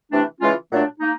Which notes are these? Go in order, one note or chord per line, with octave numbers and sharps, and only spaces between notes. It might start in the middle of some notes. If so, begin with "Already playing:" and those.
C3 E3 A3 D4
C#3 E3 G#3 C#4 F4
A#2 F#3 A3 D4
A#3 D#4